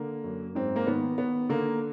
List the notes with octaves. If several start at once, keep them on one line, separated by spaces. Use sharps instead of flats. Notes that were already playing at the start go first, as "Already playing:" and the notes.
Already playing: D3 A#3
F#2
G#2 C4
A#3
D#3 B3
D#3 B3
D3 A#3